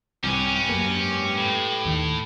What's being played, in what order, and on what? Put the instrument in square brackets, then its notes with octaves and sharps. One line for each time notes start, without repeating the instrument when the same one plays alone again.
[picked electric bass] C2 [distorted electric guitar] C#4 [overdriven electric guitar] G4 B4
[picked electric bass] F#2 A#3
[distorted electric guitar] A2
[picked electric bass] D#2